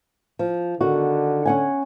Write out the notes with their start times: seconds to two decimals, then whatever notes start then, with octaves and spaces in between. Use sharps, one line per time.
0.39 F3
0.81 D3 D#3 F#4
1.45 C#4 F#5 G#5